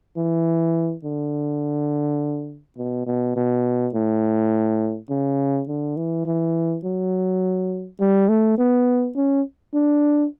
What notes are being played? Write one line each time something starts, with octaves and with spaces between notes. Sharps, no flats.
E3
D3
B2
B2
B2
A2
C#3
D3
E3
E3
F#3
G3
A3
B3
C#4
D4